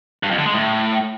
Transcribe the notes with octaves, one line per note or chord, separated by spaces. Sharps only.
G2
F2
D3
G#3
A2